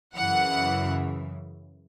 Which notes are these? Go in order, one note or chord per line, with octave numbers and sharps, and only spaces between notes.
F#2 C#3 E3 F#5